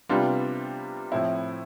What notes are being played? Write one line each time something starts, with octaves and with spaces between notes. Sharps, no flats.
C3 G3 B3 D4 F4
A2 F3 C4 E4